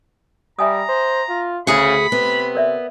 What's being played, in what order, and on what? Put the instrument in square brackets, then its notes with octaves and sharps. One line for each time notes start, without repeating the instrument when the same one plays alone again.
[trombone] G3 [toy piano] E5 G#5 D#6 [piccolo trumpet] A#5
[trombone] C5
F4
[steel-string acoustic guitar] D2 G#4 F#5 [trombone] C#3 [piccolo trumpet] B5
[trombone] C3 [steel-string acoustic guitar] B3
[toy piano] A#4 D5 E5